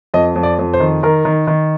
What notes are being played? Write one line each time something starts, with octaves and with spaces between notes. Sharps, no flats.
F2 D#5
F2
D5
F2
C5
D#3
D#3 A#4
D#3
D#3